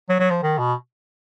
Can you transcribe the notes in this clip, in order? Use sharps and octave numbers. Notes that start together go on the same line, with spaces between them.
F#3
F#3
F3
D#3
B2